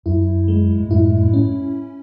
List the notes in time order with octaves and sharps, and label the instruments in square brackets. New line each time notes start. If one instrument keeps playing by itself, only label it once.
[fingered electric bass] F#2 [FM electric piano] E4
[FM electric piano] G#3
[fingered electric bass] G#2
[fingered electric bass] F#2 A2 [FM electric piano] E4
[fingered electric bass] A2
[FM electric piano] C#4